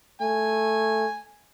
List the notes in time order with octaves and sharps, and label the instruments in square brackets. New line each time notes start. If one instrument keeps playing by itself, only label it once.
[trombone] A3 [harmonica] G#5